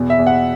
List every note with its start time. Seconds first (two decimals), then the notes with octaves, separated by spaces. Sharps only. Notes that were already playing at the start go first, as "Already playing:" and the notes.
Already playing: E2 B2
0.10 E5
0.18 E2
0.27 F#5